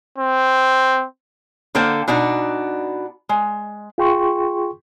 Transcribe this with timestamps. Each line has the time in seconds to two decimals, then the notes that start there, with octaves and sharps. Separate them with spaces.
0.18 C4
1.75 D3 A#3 A4 C5 G5
2.08 B2 D4 D#4 F#4
3.29 G#3
3.98 F4 G#4 G5 C6 C#6